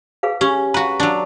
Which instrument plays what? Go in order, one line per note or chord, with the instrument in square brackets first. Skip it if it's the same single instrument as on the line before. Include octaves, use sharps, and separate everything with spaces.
[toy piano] G#4 B4 F5
[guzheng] C#4 [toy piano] G4 C#6
[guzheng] F#4 B4 [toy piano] A#5
[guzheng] F#3 D4